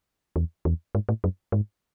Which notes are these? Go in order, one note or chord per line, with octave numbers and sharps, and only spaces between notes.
E2
E2
G#2
A2
F#2
G#2